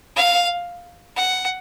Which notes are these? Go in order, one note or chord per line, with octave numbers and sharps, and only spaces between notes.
F5
F#5